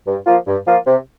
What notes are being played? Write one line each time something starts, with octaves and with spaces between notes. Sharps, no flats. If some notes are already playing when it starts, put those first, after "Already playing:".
G2
F3 A#3 F4
G2
F3 A#3 F4
C3